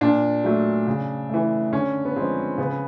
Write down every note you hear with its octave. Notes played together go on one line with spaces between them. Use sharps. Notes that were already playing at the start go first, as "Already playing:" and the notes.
A#2 D4
F#3 A3
C#3
E3 A3
D3 C#4
B3
F3 G#3 C4
C#3 B3